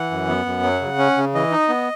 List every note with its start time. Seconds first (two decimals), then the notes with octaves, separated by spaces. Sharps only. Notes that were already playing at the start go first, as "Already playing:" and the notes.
Already playing: E3 F#5
0.11 F#2
0.29 B3
0.46 F#2
0.63 F#3
0.81 C#3
0.98 C#4
1.17 C#3
1.35 E3 D#5
1.52 D#4
1.69 B3